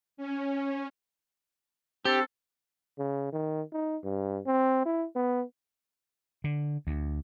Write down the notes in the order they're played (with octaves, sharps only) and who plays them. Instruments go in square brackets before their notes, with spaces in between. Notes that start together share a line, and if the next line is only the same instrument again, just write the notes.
[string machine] C#4
[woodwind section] C4 D4 A4 [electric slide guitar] G4
[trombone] C#3
D#3
D#4
G2
C4
E4
B3
[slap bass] D3
D2